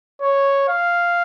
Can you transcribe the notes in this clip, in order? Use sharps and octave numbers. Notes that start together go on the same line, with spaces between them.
C#5
F5